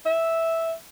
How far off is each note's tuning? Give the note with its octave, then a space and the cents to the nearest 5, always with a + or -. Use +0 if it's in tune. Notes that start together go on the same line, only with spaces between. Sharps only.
E5 -5